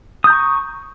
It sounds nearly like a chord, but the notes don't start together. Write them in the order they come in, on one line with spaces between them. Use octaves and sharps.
D#6 G6 A#5 C#6